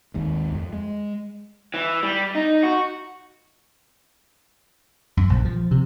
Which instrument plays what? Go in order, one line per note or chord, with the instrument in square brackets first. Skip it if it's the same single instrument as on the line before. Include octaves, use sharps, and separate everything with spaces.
[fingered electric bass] G#1 D#2 G#2
F2
G#3
[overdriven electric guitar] E3
G3
D#4
F#4
[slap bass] F#2
A#1
F3
C3